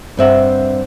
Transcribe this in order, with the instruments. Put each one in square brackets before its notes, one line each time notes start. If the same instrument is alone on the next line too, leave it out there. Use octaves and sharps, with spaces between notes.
[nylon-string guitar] G2 C4 E5 F#5